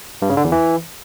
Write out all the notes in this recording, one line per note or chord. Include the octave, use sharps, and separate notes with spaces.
G2
C#3
D3
E2
E3